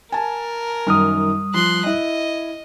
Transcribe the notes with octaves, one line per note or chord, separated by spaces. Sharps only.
A#4 G#5 A5
F#2 D#3 G3 D#6 F6
F3 C6 F#6
E4 D#5